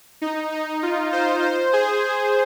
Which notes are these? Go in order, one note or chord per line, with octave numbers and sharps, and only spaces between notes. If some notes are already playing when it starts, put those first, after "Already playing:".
D#4
D#4
F4
C5
C5
G#4
G#4